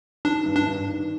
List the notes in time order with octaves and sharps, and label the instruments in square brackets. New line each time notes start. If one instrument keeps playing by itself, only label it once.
[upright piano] D#3 [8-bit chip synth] D4
[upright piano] G2
[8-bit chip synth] D4
[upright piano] G2
D#3